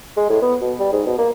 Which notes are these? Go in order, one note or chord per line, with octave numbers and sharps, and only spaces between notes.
G#3
A2
B3
B2
G3
G#2
B2
A#3